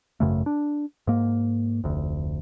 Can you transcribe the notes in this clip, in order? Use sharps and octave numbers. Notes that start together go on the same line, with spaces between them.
G#1 F#2 C#3 A3
D4
G#2 A#3
F1 D2